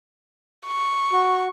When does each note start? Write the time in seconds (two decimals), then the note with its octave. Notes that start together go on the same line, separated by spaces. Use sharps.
0.67 C#6
1.12 F#4